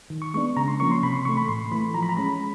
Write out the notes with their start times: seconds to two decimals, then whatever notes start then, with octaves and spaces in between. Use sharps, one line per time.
0.10 D#3
0.22 C#6
0.34 G#3 B3 D4 C#6
0.57 C#3 A#5
0.68 C6
0.80 F3 A#3 C#4 C#6
0.91 C6
1.03 C3 B5
1.14 C6
1.25 E3 A3 C#6
1.37 B5
1.48 A2 C6
1.71 E3 A3 B5
1.94 F3 A#5
2.02 B5
2.09 A#5
2.17 G#3 C#4 B5